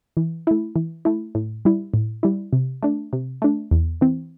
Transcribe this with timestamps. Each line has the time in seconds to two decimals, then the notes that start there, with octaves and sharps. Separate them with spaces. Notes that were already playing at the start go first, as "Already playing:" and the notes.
0.17 E3
0.47 A3 E4
0.76 E3
1.05 A3 E4
1.35 A2
1.65 G3 E4
1.94 A2
2.23 G3 E4
2.53 C3
2.82 A3 D4
3.13 C3
3.42 A3 D4
3.71 E2
4.01 E3 C4